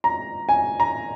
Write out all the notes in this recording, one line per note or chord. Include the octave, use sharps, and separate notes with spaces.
A#5
G#5
A#5